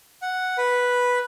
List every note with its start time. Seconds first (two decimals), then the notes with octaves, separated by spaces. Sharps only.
0.22 F#5
0.58 B4